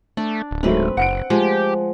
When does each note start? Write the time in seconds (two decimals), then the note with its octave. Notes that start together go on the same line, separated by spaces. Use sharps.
0.17 A3 D4
0.51 D1
0.63 G#2 F#3 A3 C4 B4
0.97 F#1 F#5 C#7 D7
1.30 F3 G#3 G4